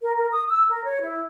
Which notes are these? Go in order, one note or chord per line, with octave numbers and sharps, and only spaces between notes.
A#4
A#4
D#6
E6
A#4
C#5
E4